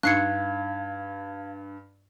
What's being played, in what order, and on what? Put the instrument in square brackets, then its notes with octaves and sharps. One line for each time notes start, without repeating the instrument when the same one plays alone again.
[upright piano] G2 [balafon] D4 D#4 [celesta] F5 G#6 [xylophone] F#6 C7 C#7